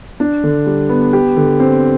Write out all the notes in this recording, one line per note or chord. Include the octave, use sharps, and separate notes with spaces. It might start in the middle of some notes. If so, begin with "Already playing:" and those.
D4
D3
G3
B3
G4
D3
C4